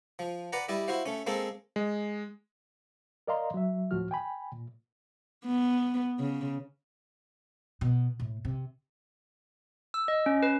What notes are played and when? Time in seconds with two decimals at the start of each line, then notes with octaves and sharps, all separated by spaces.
0.19 F3
0.53 B4 D5 F#5 A#5
0.69 G3 E4 D5 D#5
0.88 E4 F#4 C5 F5
1.06 A3 C#4
1.27 G#3 A#3 C4 A4
1.76 G#3
3.27 A#4 D5 D#5 F5 A#5 C6
3.54 F#3 E5
3.91 C#2 A2 F3 F#4 F6
4.11 G5 G#5 B5
4.52 A#2
5.45 B3
6.19 C#3
7.81 B2
8.20 A2
8.45 C3
9.94 E6
10.08 D#5
10.26 C#4
10.43 B4